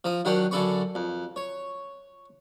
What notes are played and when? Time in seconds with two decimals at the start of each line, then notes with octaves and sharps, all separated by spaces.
0.04 F3 A#5 D#6
0.25 D#3 F#3 D4 A#4 F#5 G5
0.51 F#2 D3 A4 D5 B5 C#6
0.95 F2
1.36 C#5